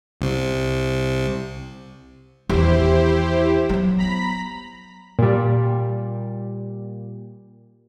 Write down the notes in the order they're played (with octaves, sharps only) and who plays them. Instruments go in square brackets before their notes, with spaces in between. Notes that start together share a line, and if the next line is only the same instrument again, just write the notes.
[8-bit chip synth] C2 C3
[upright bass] E2 D#3 [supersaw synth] E4 G4 C5
[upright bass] F#3 B3
[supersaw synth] A#5 B5 B6
[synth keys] A#2 G3